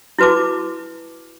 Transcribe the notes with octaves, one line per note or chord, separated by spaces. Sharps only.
E4 F#4 B4 A5 D6